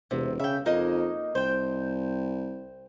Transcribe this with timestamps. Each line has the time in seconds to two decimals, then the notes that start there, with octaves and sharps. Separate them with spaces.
0.11 E1 C3
0.40 C#3 E5 G5
0.66 F2 A#3 D#4 D#5
1.35 C2 C5 G5